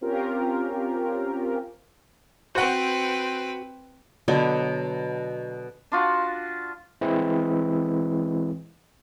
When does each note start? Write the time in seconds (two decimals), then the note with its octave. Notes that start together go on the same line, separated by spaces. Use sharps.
0.01 C4 C#4 F4 G4 A#4
2.55 C4 F#4 B4 C5 F#5
4.28 B2 D3 F#3 B3
5.92 D4 F4 F#4
7.01 E3 G#3 C4 E4